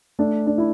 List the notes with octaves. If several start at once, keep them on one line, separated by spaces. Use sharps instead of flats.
A3 D4
D4
E4